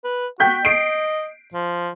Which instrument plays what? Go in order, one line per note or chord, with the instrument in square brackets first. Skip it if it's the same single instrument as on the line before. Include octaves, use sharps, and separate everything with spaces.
[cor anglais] B4
[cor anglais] F#4 [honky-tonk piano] G5 G6 B6
[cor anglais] D#5 [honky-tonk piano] C7 D7
[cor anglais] F3